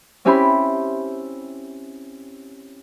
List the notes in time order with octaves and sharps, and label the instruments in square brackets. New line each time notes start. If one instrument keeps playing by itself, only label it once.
[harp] C4 C#4 E4 G4 B5 C6